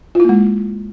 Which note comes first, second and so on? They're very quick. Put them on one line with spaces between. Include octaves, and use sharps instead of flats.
F4 E4 A#3 G#3